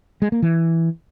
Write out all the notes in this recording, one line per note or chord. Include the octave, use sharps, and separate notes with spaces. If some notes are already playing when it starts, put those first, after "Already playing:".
G#3
A#3
E3